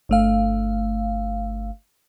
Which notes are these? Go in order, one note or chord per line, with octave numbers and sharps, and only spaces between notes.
G1 A3 F5